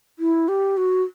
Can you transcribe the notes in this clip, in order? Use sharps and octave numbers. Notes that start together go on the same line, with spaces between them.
E4
G4
F#4